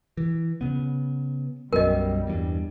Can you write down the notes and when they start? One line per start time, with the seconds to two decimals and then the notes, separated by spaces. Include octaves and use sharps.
0.17 E3
0.61 C#3 B3
1.73 B1 F#2 B2 G3 A#4 D#5
2.27 E2 G2